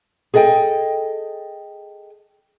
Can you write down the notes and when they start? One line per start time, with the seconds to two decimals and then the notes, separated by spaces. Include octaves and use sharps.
0.34 G#4 A4 D#5 E5 G5